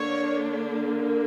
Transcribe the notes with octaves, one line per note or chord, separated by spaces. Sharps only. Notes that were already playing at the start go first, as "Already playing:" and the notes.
Already playing: D3 A#3 D4 C#5